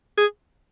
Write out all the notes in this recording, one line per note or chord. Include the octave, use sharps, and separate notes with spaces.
G#4